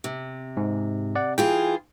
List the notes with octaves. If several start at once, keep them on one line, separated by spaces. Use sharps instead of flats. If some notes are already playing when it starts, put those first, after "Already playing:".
C3
G#2
D5 F#5
E3 F4 G#4 G5